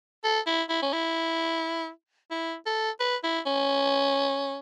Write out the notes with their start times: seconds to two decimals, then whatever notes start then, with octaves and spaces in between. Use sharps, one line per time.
0.24 A4
0.47 E4
0.69 E4
0.82 C#4
0.93 E4
2.31 E4
2.66 A4
3.00 B4
3.23 E4
3.46 C#4